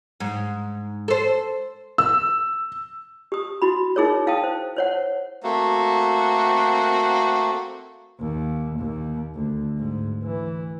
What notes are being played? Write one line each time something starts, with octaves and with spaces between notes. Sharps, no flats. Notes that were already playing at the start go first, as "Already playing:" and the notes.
G#2
A4 C5
E6
G4 D#6
E4 F#4 B5
D#4 E4 G#4 A#4 C#5
E4 F5 G5 A5 D#6
C5
C5 C#5 F#5
A3 A#3 C4 F#4
D#2
D#2
D2
G#2
E3